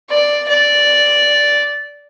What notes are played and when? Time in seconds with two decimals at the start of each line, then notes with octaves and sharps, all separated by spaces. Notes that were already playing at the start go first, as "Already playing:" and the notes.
0.10 D5
0.48 D5